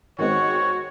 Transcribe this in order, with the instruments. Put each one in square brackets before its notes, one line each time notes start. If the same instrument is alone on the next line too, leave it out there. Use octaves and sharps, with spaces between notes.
[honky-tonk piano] D#3 G#3 C4 [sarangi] F#4 [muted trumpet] C#5